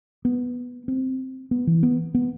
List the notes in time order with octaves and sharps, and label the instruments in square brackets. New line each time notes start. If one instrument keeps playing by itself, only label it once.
[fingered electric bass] B3
C4
B3
E3
B3
B3